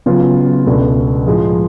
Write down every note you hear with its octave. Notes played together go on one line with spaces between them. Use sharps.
C#3 F#3 B3 F4
C#2 B2 A3 D4
A2 F3 G#3